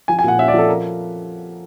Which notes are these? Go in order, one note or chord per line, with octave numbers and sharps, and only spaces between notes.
F3 G#5
G#5
A#2 F#5
C#4 E5
D5
F3 A4
A#4